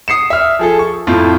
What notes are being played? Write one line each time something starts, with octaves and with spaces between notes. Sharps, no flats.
D#6 C7 C#7 E7
E5 F6
F3 G#4 A4
C#6
F2 A2 F4